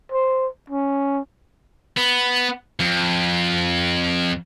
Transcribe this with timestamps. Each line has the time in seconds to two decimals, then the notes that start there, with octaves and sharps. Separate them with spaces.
0.12 C5
0.70 C#4
1.97 B3
2.80 F2